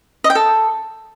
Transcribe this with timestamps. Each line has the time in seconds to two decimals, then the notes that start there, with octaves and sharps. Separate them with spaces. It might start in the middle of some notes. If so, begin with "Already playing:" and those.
0.24 D#5
0.30 G5
0.35 A4